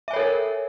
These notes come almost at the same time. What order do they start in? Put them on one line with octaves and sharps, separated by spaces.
E5 G#5 C#5 A4 A#4